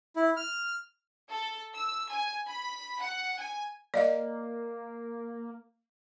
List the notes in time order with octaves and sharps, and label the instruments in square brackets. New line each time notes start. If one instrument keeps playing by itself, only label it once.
[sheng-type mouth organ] E4
F6
[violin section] A4
E6
G#5
B5
F#5
G#5
[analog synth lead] A#3 [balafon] D5 D#5 F5